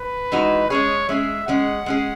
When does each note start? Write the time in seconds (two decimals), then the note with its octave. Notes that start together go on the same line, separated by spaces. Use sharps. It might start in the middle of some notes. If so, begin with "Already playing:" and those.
Already playing: B4
0.32 E3 G#3 D#4 F#4
0.70 G#3 C#4 G#4 C#5
1.09 G#3 C#4 G#4 E5
1.47 G#3 C#4 G#4 F#5
1.86 G#3 C#4 G#4